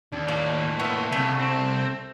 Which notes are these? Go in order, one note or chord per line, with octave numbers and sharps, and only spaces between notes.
D#2 D4
A2 A#3 D5
B3 C#5 E5
C2 C#3 A3
C4